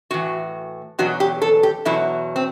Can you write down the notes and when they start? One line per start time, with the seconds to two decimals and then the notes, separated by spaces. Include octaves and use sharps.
0.11 A2 E3 F#4
0.99 E2 B2 F#3 F#4
1.20 G4
1.42 A4
1.63 G4
1.85 E2 B2 F#3 E4
2.36 C4